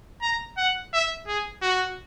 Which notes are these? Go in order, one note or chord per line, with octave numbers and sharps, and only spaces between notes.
A#5
F#5
E5
G#4
F#4